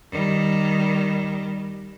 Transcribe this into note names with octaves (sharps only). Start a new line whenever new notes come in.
D#3 G3